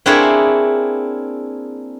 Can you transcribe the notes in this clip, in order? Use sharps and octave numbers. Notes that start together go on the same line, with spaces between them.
A#3 C4 D4 E4 G#4 C#5